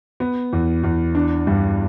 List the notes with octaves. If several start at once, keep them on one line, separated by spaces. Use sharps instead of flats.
B3
E2
E2
D4
G2